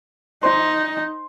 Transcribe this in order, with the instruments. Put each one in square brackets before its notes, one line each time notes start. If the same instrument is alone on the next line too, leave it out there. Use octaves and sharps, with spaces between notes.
[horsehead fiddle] D#4 [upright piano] C5